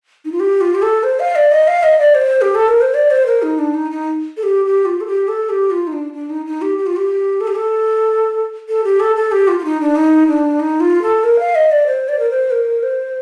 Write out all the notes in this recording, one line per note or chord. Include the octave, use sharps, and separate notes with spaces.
D#4
F4
G4
F4
G4
A4
C5
F5
D5
D#5
F5
D#5
D5
C5
G4
A4
A#4
C5
D5
C5
A#4
D#4
D4
D#4
D#4
A4
G4
G4
F4
A4
G4
A4
G4
F4
D#4
D4
D4
D#4
D#4
G4
G4
F4
G4
A4
G4
A4
A4
G4
A4
A4
G4
F4
F4
D#4
D4
D#4
D4
D#4
F4
A4
A#4
F5
D#5
D5
C5
D5
A#4
C5
A#4
C5